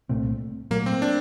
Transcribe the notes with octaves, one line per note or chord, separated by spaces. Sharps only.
C2 A#2 A3 C4
A#2 F#3 A3 A#3
C4
D4